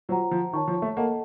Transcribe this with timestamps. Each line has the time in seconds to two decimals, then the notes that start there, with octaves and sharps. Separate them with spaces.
0.09 F#3 F4 C5 F#5 A#5
0.31 F3
0.53 D#3 C#5 A5 C#6
0.68 F3
0.82 A3
0.97 A#3 A4 D#5 F#5 A5